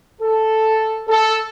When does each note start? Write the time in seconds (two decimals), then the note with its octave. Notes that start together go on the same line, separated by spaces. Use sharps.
0.22 A4
1.08 A4